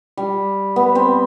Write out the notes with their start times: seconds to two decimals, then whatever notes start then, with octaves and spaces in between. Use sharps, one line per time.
0.17 G3
0.76 B3
0.95 C4